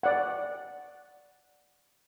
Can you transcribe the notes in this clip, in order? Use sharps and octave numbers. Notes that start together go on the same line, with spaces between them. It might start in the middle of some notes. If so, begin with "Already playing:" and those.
D5 F#5